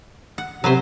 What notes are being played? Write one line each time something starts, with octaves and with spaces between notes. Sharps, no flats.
F#5
C3 F#3 B4 C5